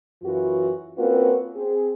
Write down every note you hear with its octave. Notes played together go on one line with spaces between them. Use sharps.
F#2 E3 F4 F#4
A#3 C4 C#4 F4 F#4 B4
C4 G#4